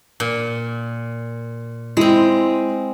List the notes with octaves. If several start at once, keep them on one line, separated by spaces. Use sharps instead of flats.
A#2
G#3 C4 E4